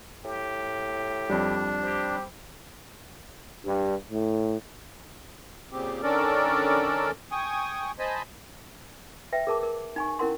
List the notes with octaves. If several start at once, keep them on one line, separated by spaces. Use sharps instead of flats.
A2 G4
F2 G3 D4
C4 G4
G2
A2
A#2 C#3 C4 G4
D#3 C#4 D4 A4 A#4 D5
G5 G#5 C#6 D#6
C5 D#5 G#5 A5 B5
B4 E5 G5
G#4 A#4 A5 D6
A#4
D#4 G#5 C#6
C#4 E4 A#4 F#5 C6